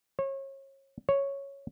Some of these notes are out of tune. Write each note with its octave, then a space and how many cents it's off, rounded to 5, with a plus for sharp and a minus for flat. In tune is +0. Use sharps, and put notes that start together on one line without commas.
C#5 -30
C#5 +0